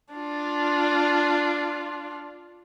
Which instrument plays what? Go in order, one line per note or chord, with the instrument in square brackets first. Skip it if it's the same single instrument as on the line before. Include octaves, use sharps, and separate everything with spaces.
[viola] D4 F4